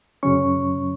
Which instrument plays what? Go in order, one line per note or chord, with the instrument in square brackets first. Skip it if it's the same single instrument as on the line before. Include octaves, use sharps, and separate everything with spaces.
[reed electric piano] F#2 C#3 F#3 C#4 C#6